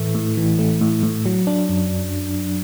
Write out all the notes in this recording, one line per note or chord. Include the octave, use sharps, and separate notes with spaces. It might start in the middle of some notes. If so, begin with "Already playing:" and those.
Already playing: A2 E3 A3
A2
E3
A3
A2
A2
F#3
D4
F#2